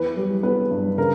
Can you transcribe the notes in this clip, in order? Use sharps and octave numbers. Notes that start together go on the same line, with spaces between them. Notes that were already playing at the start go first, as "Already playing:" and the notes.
Already playing: E2 E3 B4
G3
B3 B4
G2
C#3 A#4